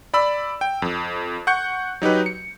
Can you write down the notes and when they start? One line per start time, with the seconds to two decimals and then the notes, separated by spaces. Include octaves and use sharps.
0.14 D5 B5 E6
0.61 G5
0.82 F2
1.47 F#5 C#6 G6 C#7
2.02 F#3 D#4 G4 B4
2.26 C#7